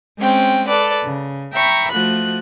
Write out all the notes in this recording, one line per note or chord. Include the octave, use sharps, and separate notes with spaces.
G#3 C4 C#4 G5
A4 B4 D5
C#3
E5 G5 A#5 B5 C#6
F3 A3 F#4 F#6